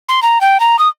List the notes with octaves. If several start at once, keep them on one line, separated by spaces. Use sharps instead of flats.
C6
A#5
G5
A#5
D#6